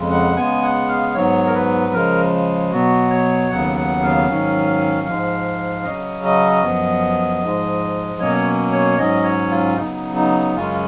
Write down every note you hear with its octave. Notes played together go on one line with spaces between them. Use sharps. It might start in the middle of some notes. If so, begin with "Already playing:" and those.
Already playing: F2 C#3 G#3
F#5
C#3 G#3 B3 G#5
F#5
F5
G#2 F#3 B3 C#5
A#4
B4
C#3 F3 G#3 A#4
B2 F#3 B3 F#4
C#5
D#2 C#3 F#3 B3 F#5
F#5
F5
G#2 D#3 F#3 C#4
G#2 F3 G#3
C#3 F#3 C#4 D#5
D#5
F#2 F3 B3
G#2 F3 G#3
B2 F#3 A#3 C#4 C#5
C#5
G#2 F#3 C#4 D#5
C#5
F4
C#3 F#3 B3 D#4
D#4
F#2 C#3 G#3 C#4 F4